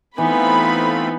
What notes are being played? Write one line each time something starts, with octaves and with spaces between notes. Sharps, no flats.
E3 A3 B3 C4 D#4 F4 B5